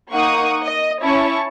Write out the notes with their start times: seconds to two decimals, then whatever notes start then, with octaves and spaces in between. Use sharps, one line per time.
0.13 A#3 D#4 F#5 C#6 D#6
0.63 D#5
1.03 C#4 E4 C#5 A5 C#6